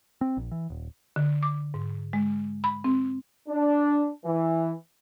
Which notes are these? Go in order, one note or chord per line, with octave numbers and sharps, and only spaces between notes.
C4
A#1
E3
D#1
D3
D6
G#2
G#3
B5
C4
D4
E3